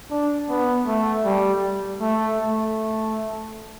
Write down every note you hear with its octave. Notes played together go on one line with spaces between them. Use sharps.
D4
B3
A3
G3
A3
A3